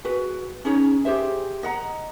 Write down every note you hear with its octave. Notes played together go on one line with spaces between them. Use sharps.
F#4 G#4 B4
C#4 D#4 G#4 C#5
G4 G#4 C5 E5
D#5 F#5 A#5